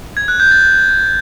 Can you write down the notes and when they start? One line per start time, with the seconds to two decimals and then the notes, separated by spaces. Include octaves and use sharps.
0.17 G#6
0.28 F#6
0.40 G6
0.51 A6